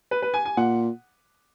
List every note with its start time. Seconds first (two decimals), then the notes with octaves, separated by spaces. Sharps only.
0.11 B4
0.22 B4
0.34 G#5
0.45 G#5
0.57 A#2 F#5